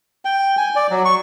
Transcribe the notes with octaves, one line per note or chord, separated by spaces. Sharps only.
G5
G#5
D5
F#3
C#6